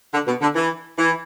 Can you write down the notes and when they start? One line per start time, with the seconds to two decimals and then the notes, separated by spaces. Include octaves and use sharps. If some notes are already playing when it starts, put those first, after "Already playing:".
0.13 D3
0.27 B2
0.42 D3
0.55 E3
0.98 E3